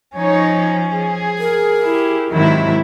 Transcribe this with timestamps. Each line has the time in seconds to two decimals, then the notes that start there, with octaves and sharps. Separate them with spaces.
0.17 F3 C#4 D#4 C#5
0.93 G#4
1.39 A#4
1.83 E4 G4
2.32 G#2 C3 D#3 F#3 E4